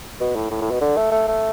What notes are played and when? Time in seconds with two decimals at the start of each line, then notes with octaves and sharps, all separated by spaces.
0.20 B2
0.36 A2
0.51 A2
0.61 A2
0.71 B2
0.81 D3
0.97 A3
1.11 A3
1.28 A3